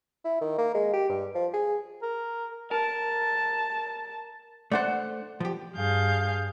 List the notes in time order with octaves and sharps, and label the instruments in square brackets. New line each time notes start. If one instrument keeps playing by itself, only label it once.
[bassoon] E4
D#3
A#3
G#3
G4
G2
F3
G#4
[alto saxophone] A#4
[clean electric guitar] A#4 [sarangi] A5
[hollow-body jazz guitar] A3 D4 C5 [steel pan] D5 F#5
[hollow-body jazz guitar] F3 G4
[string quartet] G2 G#4 F5 G6